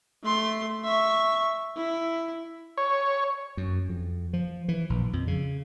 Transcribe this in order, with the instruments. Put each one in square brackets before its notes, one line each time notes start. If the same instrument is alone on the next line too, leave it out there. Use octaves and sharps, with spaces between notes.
[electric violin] A3 C6
E5 C#6
E4
[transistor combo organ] C#5
[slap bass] F#2
F2
F3
E3
A#1
F2
C#3